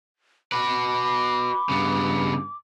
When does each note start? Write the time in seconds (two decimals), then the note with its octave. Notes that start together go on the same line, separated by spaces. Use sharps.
0.52 F#4 B4 B5 D6
1.69 G2 C#3 B3